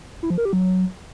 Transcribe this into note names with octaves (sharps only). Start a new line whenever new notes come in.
E4
F3
A#4
G4
F#3